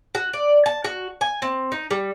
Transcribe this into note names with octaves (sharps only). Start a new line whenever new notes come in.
F#4
D5
A5
F#4
G#5
C4
D#4
G3